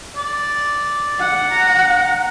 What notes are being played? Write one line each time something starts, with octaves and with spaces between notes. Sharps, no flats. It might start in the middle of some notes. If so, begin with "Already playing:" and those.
D5
F#5
A#5